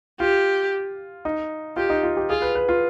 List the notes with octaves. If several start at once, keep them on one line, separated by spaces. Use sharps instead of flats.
F4 G4
D#4
F4 G4
D#4
F4
G4
F4 G#4
B4
B4
F4